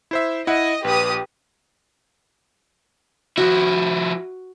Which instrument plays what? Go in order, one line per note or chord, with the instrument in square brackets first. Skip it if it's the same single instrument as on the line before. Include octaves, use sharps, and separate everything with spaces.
[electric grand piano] E4 C5 E5
[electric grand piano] E4 F#5 [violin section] D#5
[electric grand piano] A#1 [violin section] G4 B4 D#6
[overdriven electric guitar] F3 E4 [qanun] F#4